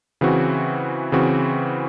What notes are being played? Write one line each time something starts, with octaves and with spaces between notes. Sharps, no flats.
C#3 E3 C4 F#4
C#3 E3 C4 F#4